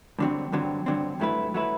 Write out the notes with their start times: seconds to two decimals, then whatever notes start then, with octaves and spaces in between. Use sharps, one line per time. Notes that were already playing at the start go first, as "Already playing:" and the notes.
0.19 G2 D3 F#3 C4
0.52 G2 D3 F#3 C4
0.86 G2 D3 F#3 C4
1.20 G2 F#3 A3 E4 B4
1.54 F#3 A3 E4 B4